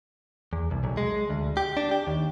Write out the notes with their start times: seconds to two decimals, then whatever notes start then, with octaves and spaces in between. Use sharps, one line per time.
0.53 E2
0.71 C2
0.84 B1
0.97 G#3
1.30 D2
1.57 G4
1.77 D4
1.91 G4
2.07 D#2